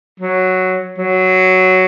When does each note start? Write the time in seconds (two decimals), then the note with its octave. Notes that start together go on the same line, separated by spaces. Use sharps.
0.20 F#3
0.98 F#3